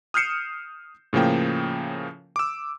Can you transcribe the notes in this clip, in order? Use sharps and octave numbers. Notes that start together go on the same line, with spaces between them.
D#6 F6 G6 C7 C#7 E7
A2 C#3 F3 A#3 G5
D6 E6